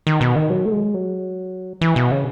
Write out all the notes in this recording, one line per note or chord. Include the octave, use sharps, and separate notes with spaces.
D#3
B2
D#3
F#3
A3
G#3
F#3
E3
B2
C#3